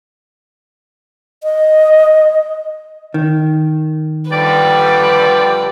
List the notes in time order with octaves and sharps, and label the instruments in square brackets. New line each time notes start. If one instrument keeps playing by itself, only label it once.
[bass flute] D#5
[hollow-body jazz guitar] D#3
[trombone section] F2 D3 G3 [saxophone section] G4 D5 [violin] B4